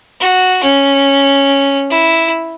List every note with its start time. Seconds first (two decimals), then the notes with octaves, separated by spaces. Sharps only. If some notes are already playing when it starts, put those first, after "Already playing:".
0.20 F#4
0.63 C#4
1.90 E4